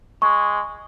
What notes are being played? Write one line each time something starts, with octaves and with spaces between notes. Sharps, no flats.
G#3 C#6